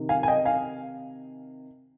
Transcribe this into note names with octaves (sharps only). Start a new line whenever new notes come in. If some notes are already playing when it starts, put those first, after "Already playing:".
Already playing: C3 D#3
F5 G#5
G#5
D#5 G5
F5 G#5